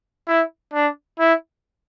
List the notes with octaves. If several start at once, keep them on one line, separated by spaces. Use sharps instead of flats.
E4
D4
E4